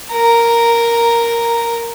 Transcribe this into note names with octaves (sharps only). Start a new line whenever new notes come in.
A#4 A#5